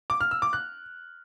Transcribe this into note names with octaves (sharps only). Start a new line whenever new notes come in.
D6
F6
E6
D6
F#6